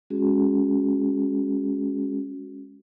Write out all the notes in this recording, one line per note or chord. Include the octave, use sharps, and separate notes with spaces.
G#3 C#4 F#4 G#4